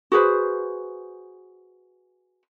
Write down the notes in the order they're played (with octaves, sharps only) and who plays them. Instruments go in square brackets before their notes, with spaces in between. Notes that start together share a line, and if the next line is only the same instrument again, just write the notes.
[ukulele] F#4 G#4 B4 C5